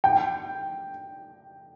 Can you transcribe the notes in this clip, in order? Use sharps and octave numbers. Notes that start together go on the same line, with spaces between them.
G5